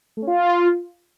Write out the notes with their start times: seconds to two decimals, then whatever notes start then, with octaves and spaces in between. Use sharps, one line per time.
0.17 A3
0.22 C#4
0.27 F4